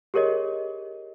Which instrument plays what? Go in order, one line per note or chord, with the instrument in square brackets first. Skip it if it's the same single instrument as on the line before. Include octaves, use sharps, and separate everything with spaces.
[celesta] G4 G#4 A#4 C#5 D#5